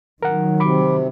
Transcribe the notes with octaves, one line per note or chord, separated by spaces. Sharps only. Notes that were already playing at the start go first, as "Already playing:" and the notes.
D#3 F#3 A#4 F#5
C3 B5 D6